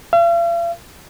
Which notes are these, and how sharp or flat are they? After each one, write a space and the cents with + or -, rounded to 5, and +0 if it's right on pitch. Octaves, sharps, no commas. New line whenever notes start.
F5 -45